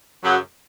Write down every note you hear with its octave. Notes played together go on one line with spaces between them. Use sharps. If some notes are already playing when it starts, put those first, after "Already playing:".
F#2 C#3 F#3